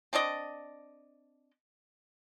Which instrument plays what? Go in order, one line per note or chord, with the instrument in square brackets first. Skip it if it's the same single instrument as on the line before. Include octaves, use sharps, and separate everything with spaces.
[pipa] C4 D4 D5 D#5